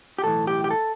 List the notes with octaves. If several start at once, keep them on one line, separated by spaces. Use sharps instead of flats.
G4
B1 A2 E3 A4
G4
G4
A4